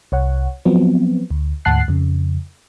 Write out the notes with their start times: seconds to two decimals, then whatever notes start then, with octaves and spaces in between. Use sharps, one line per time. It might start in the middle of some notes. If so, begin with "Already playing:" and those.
0.12 C2 C#5 F#5
0.65 F3 F#3 B3 C4
1.30 D2
1.65 D2 G#2 F#5 A5 F#6 C7
1.88 F2 C#3